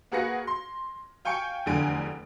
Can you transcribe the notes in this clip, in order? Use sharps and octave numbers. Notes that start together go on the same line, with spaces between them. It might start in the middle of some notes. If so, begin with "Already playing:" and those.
A#3 F#4 G#4 B4 A#6 C#7
C6
F5 G5 G#5 C#6 C#7
F1 E2 D3 G#5 D7